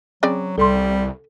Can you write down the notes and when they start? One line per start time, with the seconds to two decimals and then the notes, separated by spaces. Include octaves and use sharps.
0.23 C#3 F#3 C4 D5
0.58 C2 G3 A4 C6